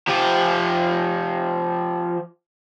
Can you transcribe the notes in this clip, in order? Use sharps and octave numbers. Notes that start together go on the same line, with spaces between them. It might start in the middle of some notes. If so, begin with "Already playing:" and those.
F3 G4